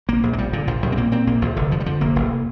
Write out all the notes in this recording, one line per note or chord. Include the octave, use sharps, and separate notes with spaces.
A#1 A#3
A#1
A#3
A#2 G3
A#2 D3
A#1 F3
A#1 G3
C4
A#2 A#3
A#2 C4
A#1 A#3
A#1 F3
F1 D3
F2 F3
G3
D3 F3
F1 A#3
F1